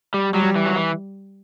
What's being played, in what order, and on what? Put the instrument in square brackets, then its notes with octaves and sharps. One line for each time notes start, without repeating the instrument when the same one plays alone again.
[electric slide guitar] G3
[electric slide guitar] F#3 [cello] G3
[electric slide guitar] E3
F#3
E3